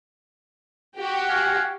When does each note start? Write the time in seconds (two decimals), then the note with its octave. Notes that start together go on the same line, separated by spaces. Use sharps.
0.97 F#4 G4
1.29 F5 F#5 G#5